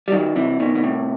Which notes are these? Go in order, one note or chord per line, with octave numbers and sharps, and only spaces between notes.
G3
D#3 F#3
C3 E3
B2 D#3
B2
A2 C3